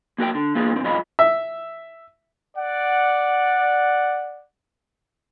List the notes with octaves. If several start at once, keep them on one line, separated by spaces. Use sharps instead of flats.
A#3 F#4 A#4 G5
D3
A#3 B3 F4 G#4
G2 A#2 C4
B1 G#2 F4 D#5 B5
E5
D5 F#5